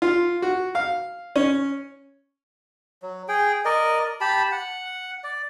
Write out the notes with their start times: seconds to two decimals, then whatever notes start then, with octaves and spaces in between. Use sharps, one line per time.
0.02 F4
0.42 F#4
0.75 F5
1.36 C#4
3.02 F#3
3.28 G#4 G5
3.65 A#4 D5 D#5
4.21 G4 A5 B5
4.52 F#5
5.24 D5